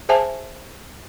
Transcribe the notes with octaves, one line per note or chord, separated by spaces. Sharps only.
G#4 C5 E5 G#5 A5